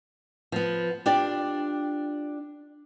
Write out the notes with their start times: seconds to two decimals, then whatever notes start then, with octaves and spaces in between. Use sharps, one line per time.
0.52 F3 B3
1.06 D4 F4 G4 D5